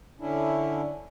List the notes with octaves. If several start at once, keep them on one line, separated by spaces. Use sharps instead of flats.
D3 C#4 D4 E4